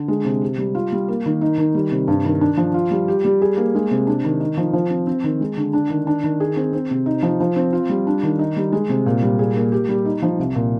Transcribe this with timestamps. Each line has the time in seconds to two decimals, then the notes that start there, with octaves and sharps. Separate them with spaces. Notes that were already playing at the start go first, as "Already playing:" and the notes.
Already playing: D3
0.08 G#3
0.25 C3
0.41 G4
0.58 G3
0.75 F4
0.92 G3
1.08 A#3
1.26 D#3
1.41 D#4
1.58 D#3
1.74 G3
1.91 C3
2.08 G2
2.25 D#3
2.41 D4
2.57 F3
2.74 F4
2.91 G3
3.08 G4
3.25 G3
3.42 G#4
3.57 A#3
3.75 G#3
3.91 C3
4.07 D4
4.24 D#3
4.40 D#4
4.57 F3
4.73 F3
4.90 C4
5.07 C4
5.24 D#3
5.41 G#3
5.57 D3
5.73 D4
5.90 D#3
6.07 D4
6.24 D#3
6.40 G#4
6.57 C4
6.73 C4
6.91 C3
7.06 D#4
7.23 F3
7.40 F3
7.56 C4
7.73 F4
7.89 G3
8.07 D4
8.23 D#3
8.39 D#4
8.56 G3
8.72 G#3
8.89 C3
9.06 A#2
9.22 G3
9.39 G#4
9.56 A#3
9.72 G4
9.89 G3
10.05 D#4
10.22 F3
10.39 C2
10.55 A#2